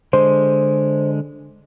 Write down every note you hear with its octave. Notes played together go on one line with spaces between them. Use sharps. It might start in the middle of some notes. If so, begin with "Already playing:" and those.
D3 G#3 C5